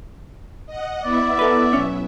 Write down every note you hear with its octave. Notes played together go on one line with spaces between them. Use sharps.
D#5 F#5
B3 E4 D5 E5
A4 B4
B1 C#4